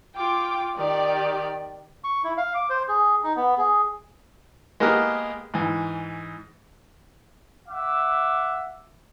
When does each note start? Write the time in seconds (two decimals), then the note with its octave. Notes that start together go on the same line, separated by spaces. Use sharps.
0.16 F4 G5 D6
0.77 D#3 G4 D5
2.04 C#6
2.24 E4
2.37 F5
2.55 D6
2.70 C5
2.88 G#4
3.24 D#4
3.36 B3
3.58 G#4
4.80 G#3 A#3 B3 G4 A#4
5.54 G#2 E3
7.68 E5 F#5 D6